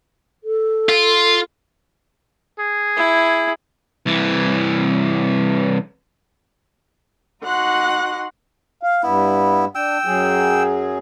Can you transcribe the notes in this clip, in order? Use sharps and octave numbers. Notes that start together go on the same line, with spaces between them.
A4
F4
G#4
E4
C2 E3
D#4 F#4 F#5 C6 F#6
F5
G2 B3 E4
D4 G5 E6
F#2 F#3 G#4